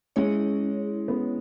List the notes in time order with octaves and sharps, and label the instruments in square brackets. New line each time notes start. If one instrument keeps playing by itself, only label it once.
[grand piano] G#3 [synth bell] C#4 E4 G#4 C#5
[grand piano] B3